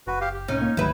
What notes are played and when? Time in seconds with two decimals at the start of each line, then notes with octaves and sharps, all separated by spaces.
0.07 F#1 F#4 B4
0.21 G4 F5
0.34 G4
0.48 C2 A2 C3 C#4 D#4
0.62 A#3
0.77 G#1 D2 F3 F#3 E4 B4